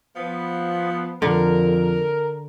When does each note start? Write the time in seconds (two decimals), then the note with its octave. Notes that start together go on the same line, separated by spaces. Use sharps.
0.16 F3 B3
1.22 F2 D3 A#4